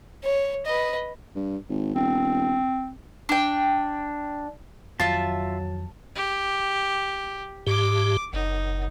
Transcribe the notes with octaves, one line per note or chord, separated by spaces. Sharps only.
C#5
B4 D#5
G2
G#1
E1 C4
D4 G5
F2 D#3 F3 F#3 F4 E5 A5
G4
G#2 G4 D6
F#1 D#4